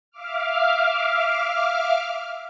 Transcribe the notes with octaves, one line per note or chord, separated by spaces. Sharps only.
E5 F5 D6 F6